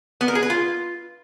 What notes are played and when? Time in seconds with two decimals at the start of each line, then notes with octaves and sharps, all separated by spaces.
0.21 B3
0.28 A#4
0.35 G#4
0.43 B4
0.50 F4